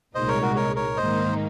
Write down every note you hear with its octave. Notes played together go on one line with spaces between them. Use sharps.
C2 A#2 G#3 D#4 C5 D#5
A#4 C#5
F#4 A#4
A#4 C#5
A#4 C#5
G#2 D#3 A#3 D#4 C5 D#5